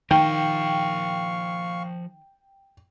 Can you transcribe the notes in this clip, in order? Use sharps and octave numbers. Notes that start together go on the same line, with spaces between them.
D#3 F3 A#4 F5 G5 C#6